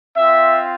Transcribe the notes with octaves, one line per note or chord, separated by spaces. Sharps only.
C4 F4 E5